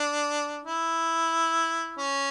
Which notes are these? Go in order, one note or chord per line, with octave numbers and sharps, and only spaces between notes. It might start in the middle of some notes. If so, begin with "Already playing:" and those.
Already playing: D4
E4
C#4